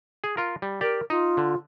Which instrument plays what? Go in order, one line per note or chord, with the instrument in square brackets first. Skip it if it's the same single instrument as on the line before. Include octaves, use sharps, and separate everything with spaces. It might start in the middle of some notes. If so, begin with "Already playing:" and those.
[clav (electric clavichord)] G#4
F4 A#4
G3
[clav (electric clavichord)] G4 D5 [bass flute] A#4
[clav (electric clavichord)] D#4 [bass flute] F4
[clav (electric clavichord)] D3